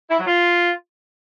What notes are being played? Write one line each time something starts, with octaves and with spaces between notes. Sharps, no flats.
E4
F#3
F4